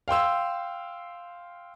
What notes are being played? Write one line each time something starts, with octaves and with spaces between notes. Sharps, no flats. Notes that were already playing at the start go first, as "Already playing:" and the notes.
F5 G5 C6 E6